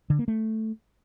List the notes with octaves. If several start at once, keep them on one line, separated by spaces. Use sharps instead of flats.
D3
A#3
A3